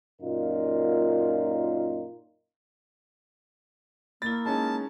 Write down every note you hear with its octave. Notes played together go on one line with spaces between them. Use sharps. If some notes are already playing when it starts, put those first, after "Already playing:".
F#2 A#2 D#4 F4 A#4
A#3 E4 B5 A6
G#3 C#4 D#4 A5